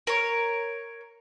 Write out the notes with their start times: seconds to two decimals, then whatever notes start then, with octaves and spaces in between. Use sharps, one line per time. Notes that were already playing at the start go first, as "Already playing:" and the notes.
0.07 A#4 C#5